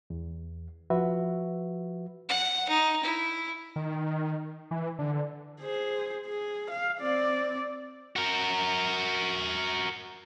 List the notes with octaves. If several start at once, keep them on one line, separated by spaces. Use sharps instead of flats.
E2
F3 F#4 B4 E5
F#5
D#4
E4
D#3
E3
D3
G#4 C5
G#4
F5
C4 D5
F#4 A#4